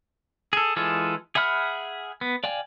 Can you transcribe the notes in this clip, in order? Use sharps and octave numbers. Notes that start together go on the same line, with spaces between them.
G#4 A4
E3 G#3 F4 G#4 A4
G#4 E5 F#5 B5 F6
B3
D5 F5 G5 G#5